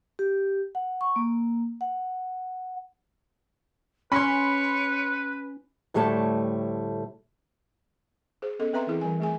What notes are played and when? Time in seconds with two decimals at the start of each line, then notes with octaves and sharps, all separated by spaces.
0.19 G4
0.75 F#5
1.01 C#6
1.16 A#3
1.81 F#5
4.12 C#4 B4 C#5 B5 C6
5.94 D2 A2 G3 A3 C#5 A5
8.42 G#4 C5
8.59 B3 C#4 A4 D#5
8.73 C4 B4 E5 A#5 C6
8.87 E3 C4 E4 G#4
9.01 E3 G3 G#5
9.20 A3 G#4 G#5